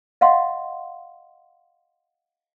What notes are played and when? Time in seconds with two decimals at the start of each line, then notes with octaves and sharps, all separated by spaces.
0.21 D#5 F5 F#5 C6